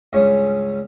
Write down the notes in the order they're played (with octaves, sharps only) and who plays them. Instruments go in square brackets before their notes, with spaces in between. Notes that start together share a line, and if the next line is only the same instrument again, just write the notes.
[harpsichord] C#2 G2 C#3 C#4 C#6